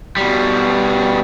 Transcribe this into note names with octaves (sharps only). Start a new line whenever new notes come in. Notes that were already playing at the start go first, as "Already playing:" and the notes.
B2 G3